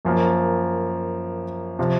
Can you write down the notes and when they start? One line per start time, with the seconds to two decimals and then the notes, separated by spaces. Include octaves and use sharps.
0.05 F#2 F3 A#3
1.79 C3 F3